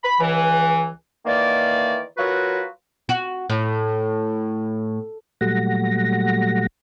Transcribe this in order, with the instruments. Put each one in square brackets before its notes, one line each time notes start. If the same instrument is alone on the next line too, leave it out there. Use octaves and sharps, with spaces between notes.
[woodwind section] B5
C#2 E3
D#3 E3 A#3 D5
F#3 F4 F#4 A#4 B4
[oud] F#4
A2
[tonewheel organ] A#2 F#3 G3 A3 F#5 A#6